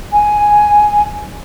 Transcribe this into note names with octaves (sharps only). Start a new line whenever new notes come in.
G#5